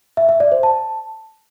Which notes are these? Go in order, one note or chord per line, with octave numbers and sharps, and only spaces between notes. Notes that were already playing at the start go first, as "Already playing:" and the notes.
E5
E5
D5
C5
A5